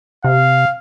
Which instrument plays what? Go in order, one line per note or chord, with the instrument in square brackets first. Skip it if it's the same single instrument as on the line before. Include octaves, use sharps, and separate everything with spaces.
[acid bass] C3 [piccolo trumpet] F5